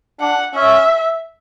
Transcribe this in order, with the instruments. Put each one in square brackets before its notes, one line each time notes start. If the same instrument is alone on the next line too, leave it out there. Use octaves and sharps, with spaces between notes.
[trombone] D4 [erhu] F#5
[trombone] C#4 [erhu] E5